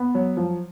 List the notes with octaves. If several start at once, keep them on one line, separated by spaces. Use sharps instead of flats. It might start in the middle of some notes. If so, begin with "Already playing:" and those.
Already playing: B3
F#3
F3